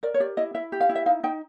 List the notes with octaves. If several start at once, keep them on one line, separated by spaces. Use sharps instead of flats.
A#4 D5
C#5
G4 D5
E4 D#5
E4 E5
G4
F5
E4
E5
D#4 F5
D#4 G5